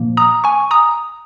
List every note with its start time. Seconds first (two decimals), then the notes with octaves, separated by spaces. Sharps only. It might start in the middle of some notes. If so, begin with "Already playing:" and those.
Already playing: A#2 F3 A#3
0.17 A#5 D#6
0.44 G#5 C#6
0.71 A#5 D#6